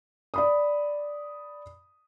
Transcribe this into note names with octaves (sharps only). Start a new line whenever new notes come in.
D5 B5 D#6